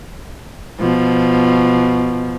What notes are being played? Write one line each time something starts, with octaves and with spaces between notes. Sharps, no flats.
B2 F3